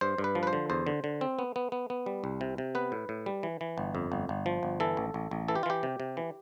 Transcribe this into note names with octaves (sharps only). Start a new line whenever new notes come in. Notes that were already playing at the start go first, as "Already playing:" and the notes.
G2 C5
G2
B4
F3
B4
C5
D3
E2 C5
D3
D3
C4
B3
B3
B3
B3
G3
C2
C3
C3
B3 B4
A2
A2
G3
E3
E3
G1
F2
G1
G1
F3
G1
E3 A4
A1
A1
A1
E3 A4
G4
F4
E3 G4
C3
C3
E3